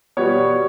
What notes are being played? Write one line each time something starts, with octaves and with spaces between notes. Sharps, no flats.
B2 G3 B3 C#5